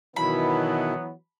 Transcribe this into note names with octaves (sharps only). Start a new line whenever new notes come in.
B2 D#3 E3 F#3 B3 E4 B5